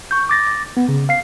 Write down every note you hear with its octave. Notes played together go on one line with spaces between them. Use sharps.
C#6 G6
D6 A6 A#6
B3
C#3
F5 C7